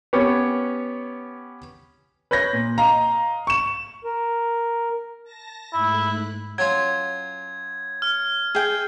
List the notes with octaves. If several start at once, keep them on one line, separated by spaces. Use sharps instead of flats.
B3 C#4 G4 C#5
B4 C#5 G6 A#6
A#2
D#5 F5 A#5
C#6 E7
A#4
A5 A#6
G#2 A3 E4 F#6
F#3 C#4 F4 G#6
F6
G#4 G5